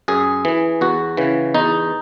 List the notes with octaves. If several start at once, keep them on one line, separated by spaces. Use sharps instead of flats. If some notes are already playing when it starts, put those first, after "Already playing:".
F#2 G#4
E3
E2 F#4
C#3 E3
E2 D#4